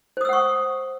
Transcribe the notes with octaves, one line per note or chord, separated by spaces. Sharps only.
C5 F#5 C#6 D#6 E6